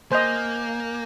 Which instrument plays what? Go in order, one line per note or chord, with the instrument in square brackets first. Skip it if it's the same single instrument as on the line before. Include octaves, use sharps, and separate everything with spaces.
[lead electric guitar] A#3 [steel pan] C5 D#5 [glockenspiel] G#5 G6 F7